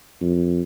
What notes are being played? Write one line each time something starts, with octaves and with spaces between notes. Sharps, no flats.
F2